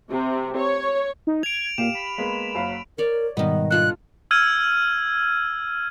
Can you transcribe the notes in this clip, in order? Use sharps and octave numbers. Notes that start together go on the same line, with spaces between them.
C3
C#5
D#4
G#6 D7 F7
A#2 G4 F5 E7
B5
G#3 A#3 B3
F#1 F#3 F5
A#4 C#5 D5
G#2 B2 D#3 G3 B3 D#5
D4 F4 A4 F#6
E6 F6 G#6 D#7